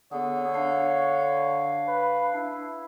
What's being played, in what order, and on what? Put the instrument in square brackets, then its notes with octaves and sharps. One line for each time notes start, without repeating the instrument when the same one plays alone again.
[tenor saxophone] D3 [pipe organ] B3 G#4 [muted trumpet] C#5
[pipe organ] D4 F5
[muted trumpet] B4
E4